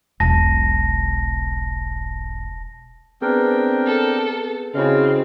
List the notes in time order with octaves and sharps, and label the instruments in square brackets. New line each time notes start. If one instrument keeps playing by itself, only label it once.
[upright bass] E1 B1 [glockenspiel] A5 A#6
[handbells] B3 G#4 B4 [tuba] C4 [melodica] D4 A#4 G5
[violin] A4
[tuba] C#3 [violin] C4 [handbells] E4 F#4 D#5 [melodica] F5